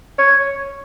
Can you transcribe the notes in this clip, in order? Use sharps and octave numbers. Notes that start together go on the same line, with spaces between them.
C#5